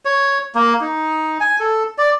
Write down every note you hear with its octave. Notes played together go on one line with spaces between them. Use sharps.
C#5
A#3
D#4
G#5
A4
D5